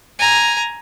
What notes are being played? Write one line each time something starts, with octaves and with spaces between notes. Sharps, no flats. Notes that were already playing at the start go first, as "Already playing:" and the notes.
G#5 A#5